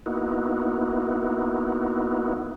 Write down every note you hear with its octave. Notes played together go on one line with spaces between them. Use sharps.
A#3 B3 D#4 E4 F#4